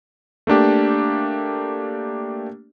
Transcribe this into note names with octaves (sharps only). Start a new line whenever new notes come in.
A3 A#3 D4 G4